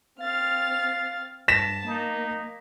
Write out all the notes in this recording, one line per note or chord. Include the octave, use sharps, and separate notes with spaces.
C4 F5 F6 A6
G2 A5 A#6 B6 E7
A#3 D#4